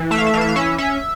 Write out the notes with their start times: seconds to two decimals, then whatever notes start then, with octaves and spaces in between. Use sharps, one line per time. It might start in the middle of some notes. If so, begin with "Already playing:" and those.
Already playing: E3
0.11 A3 E5
0.18 F5
0.26 E5
0.34 E3 F5
0.41 E5
0.49 F5
0.56 C#4 E5
0.78 C#4 E5